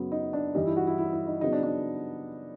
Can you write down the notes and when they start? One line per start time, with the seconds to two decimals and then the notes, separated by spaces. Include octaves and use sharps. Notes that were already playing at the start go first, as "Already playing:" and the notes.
Already playing: F#2 C#3 F#3 B3
0.12 D#4
0.33 D4
0.55 G2 E3 G3 D#4
0.66 E4
0.77 F#4
0.87 E4
0.98 E4
1.13 E4
1.27 D#4
1.41 C#3 F#3 B3 D#4
1.53 D4
1.63 D4